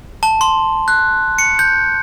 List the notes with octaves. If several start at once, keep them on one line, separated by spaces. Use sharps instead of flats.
A5
C6
F#6
C#7
G6